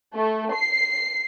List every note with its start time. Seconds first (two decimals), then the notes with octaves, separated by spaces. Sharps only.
0.14 A3
0.54 C7